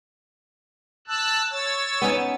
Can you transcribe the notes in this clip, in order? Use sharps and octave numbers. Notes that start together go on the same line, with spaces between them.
A5 E6 F#6
C#5 E6 A6
B3 C#4 D#4